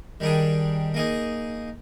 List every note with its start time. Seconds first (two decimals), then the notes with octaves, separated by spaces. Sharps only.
0.20 D#3 G3 D4 G#4
0.94 A#3 D#4 G#4